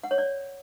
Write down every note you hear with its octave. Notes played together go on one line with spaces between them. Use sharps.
F#5
C#5
D5